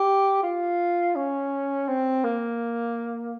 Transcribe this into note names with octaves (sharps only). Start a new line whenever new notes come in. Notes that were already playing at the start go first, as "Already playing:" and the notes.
Already playing: G4
F4
C#4
C4
A#3